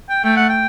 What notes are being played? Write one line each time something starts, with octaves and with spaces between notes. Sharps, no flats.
G5
A3 G5
F#5
G5